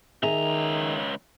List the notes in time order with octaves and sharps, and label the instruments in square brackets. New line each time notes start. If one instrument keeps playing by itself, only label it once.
[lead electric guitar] C#2 A#5 [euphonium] D#3 [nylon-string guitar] G#4 E5